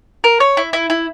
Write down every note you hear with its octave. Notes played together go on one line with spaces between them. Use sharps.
A#4
C#5
E4
E4
E4